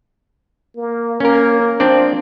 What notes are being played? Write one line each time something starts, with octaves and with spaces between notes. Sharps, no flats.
A#3
A#3 C#4 A#4
F3 C4 D4 D5